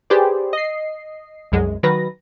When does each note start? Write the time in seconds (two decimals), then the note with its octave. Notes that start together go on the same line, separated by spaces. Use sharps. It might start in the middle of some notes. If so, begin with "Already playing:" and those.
0.10 G4 G#4 B4 C5 D5
0.53 D#5 C7
1.52 C2 F#2 G#3
1.83 D#3 F#3 B4 A#6